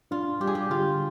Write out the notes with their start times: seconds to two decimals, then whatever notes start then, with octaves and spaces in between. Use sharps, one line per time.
0.11 D4 F4
0.40 G3 G4
0.47 G#4
0.55 G4
0.70 D3 F4